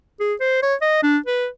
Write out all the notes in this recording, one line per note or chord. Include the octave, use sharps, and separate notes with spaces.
G#4
C5
C#5
D#5
D4
B4